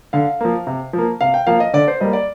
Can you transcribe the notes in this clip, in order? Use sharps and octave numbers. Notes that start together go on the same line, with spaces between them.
D3 F5
F3 A#3
C3
F3 A#3
C3 F5
G5
F3 A#3 F5
D#5
D3 D5
C5
G3 A#3 D#5
D5